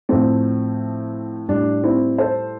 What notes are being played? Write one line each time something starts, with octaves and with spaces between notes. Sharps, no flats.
A2 F3 A3 C4
A2 G3 D4
C4 E4
A4 C5